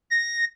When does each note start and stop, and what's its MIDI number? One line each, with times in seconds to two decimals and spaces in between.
0.10 0.45 94